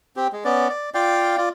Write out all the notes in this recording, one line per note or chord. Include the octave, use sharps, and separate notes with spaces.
C4 G4
G#3
B3 C#4 D5
D5
F4 D5 F5 G5
F4 D5